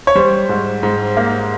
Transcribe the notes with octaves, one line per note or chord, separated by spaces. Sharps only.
C#5
G3 C5
G#2
G#2
A#3